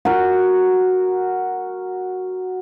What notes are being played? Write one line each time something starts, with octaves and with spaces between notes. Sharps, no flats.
F#4 A#4